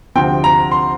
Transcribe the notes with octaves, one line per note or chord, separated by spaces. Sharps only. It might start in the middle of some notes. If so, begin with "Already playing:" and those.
D2 C3 F3 C4 G5
A#5
C6